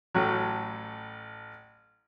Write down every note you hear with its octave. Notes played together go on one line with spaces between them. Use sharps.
A1 A2 F#3